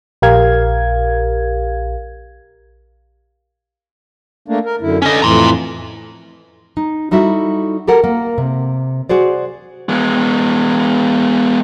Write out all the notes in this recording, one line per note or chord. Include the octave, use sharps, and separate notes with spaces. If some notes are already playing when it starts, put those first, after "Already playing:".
A#1 G4 A#4 F5 G#6
A3 A#3 D4
A#4
F#2 D3 E4
D3 C#4 D#5
F2 A2 E3 A#5 C6
D#4
G3 D#4 E4 F#4 A4 E5
G4 A4 A#4 F#5
A#3
C3
F#4 G#4 C5 D5
G#3 B3